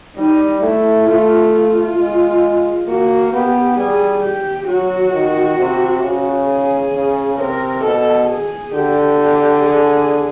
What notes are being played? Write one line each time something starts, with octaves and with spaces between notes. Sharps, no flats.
G3 D#4
A3 E4
A3 F4
F4
G#3
A#3 F#4
B3 G4
G3 G#4
G4
F#3 F#4
D#3
C3
C#3
G#4
C#3
C3 A#4
B2 A4
G#4
D3 G4
G4
G#4